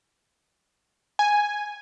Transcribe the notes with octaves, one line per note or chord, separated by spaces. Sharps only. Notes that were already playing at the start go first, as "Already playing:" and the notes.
G#5